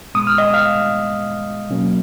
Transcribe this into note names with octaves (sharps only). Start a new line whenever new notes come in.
A#2 G#3 B3 D#6
F6
D#5 D#6
F5 F6
B2 F#3 A#3 C#4